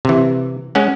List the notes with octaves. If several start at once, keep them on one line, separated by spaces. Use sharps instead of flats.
C3 E3
G#3 C#4 F#5